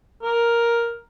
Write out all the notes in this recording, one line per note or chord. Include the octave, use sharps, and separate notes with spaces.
A#4